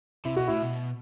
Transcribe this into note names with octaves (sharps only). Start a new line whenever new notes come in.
C3 E4
B2 F#4
A2 E4
B2